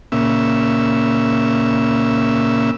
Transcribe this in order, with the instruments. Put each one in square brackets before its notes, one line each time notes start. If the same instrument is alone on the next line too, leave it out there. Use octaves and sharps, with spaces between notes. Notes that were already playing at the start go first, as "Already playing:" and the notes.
[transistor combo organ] A#2 C#3 E5